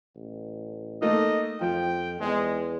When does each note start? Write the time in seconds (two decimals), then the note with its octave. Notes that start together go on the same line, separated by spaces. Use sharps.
0.16 A1
1.02 A3 A#3 D#4 D#5
1.61 F2 F3 G5
2.20 E2 G#3